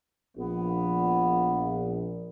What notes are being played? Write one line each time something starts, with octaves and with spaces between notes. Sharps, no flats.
A#1 B3